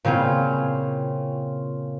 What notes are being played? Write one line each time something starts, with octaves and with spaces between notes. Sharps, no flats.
A#2 C#3 C4 C#4 F4